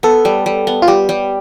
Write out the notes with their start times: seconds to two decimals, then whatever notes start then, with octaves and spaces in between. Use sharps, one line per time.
0.03 B3 A4
0.25 G3
0.46 G3
0.67 B3
0.82 F4
0.88 G3 G4
1.09 G3